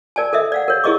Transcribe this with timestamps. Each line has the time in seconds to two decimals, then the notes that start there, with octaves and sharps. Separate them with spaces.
0.16 A#4 D5 G#5 A5
0.33 A4 A#4 D#5 E5
0.52 D5 F5 F#5
0.68 A#4 C#5
0.84 E4 G#4 A#4 D#5 C#6 D6